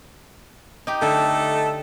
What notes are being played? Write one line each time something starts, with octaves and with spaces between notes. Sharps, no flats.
D#4 G4
D3 A3 D#4 A4